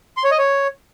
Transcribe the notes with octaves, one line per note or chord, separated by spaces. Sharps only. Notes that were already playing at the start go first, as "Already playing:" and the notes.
C6
C#5
D#5
C#5